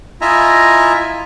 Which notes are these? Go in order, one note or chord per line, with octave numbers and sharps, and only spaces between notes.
E4 F4 D#5 E5 G#5 A#5